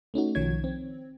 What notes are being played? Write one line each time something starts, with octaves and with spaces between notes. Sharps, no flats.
A3 C#4 D#4 F#4
B1 D#3 F3 C#5 G#6
C4